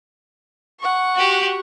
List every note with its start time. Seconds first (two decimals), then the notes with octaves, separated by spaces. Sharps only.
0.80 F#5 C#6
1.15 F#4 G4